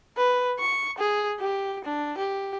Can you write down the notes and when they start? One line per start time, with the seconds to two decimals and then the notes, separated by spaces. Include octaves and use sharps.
0.17 B4
0.59 C#6
0.98 G#4
1.40 G4
1.85 D4
2.18 G4